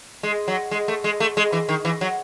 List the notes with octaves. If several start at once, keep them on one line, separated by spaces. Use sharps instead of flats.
G#3
F#3
G#3
A3
G#3
A3
G#3
E3
D#3
E3
F#3